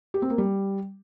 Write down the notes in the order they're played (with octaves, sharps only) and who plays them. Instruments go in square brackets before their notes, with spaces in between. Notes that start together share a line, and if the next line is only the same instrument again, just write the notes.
[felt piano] G4
C4
A#3
G3